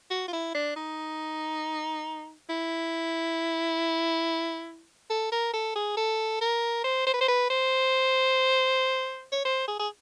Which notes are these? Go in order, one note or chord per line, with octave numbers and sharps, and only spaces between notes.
F#4
F4
E4
D4
D#4
E4
A4
A#4
A4
G#4
A4
A#4
C5
C5
B4
C5
B4
C5
C#5
C5
G#4
G#4